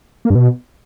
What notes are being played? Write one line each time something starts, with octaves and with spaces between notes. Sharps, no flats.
A#3
G2
B2